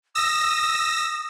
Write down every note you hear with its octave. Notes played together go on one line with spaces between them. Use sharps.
D#6 E6 A#6